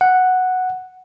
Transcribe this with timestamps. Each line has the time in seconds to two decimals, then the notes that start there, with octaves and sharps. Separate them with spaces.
0.01 F#5